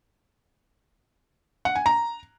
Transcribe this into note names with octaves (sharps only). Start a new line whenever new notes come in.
F#5
G#5
A#5